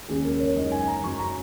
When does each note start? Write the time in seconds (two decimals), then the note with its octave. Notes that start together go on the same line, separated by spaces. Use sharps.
0.08 D#2 C#3 G#3 C#4 G#4
0.25 A#4
0.40 C#5
0.56 F#2 C#3 G#3 D#4 D#5
0.72 G#5
0.88 A#5
1.04 F#2 F#3 C#4 C#6
1.19 A#5